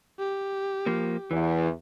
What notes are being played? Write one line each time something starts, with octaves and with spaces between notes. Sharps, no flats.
G4
F3 A#3
E2 E3